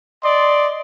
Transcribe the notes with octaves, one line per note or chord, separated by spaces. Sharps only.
D5 D#5 C6